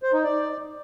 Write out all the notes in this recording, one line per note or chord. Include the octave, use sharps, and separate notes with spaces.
C5
D#4
D5